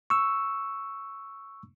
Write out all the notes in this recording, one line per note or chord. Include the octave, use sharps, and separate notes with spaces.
C#6 E6